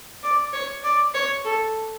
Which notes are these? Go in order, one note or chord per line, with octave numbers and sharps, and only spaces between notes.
D5
C#5
D5
C#5
A4